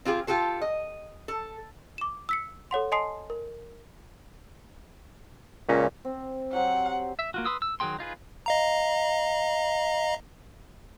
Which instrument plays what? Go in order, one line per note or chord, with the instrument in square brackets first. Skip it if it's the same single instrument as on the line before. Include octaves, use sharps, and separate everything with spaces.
[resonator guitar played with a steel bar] C4 F4 G4 G#4
F4 G4 A4 C5
D#5
A4
[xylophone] D6 E7
E6 B6 C#7
A4 C#5 F#5 C6
D#5 G#5 A5 C6 D#6 C7
A#4
[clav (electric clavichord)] C#2 C#4 A#5 [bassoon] A#2
[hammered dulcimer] C4
[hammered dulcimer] F#3 G4 C5 [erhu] F#5
[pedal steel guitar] E5
A#3 F4 F#4
B4 C6 D#6 E6
E6
D#3 F#3 G#4 G5 C6
D#4 F4 G#4 B4
[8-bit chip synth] D#5 F5 A#5